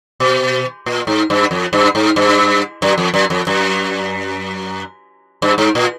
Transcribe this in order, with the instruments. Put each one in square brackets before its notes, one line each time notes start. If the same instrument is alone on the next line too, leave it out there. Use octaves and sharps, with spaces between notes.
[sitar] B2
A#2
G#2
G2
F2
G2
G#2
G2
F#2
F2
F#2
F2
F#2
G2
G#2
A#2